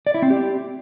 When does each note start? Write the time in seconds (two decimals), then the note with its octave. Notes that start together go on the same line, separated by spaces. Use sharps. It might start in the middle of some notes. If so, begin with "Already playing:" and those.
0.07 D5
0.14 E4
0.22 C4
0.30 G4